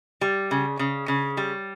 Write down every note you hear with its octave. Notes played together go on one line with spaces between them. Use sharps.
G3
C#3
C#3
C#3
G3